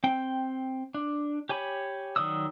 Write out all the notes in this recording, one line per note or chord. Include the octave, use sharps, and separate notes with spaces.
C4 G5
D4
G4 C#5 G#5 B5
D#3 F#3 D5 D#6 E6